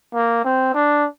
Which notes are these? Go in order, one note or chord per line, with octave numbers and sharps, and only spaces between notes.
A#3
C4
D4